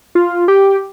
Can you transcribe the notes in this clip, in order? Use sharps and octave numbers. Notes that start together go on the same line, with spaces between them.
F4
G4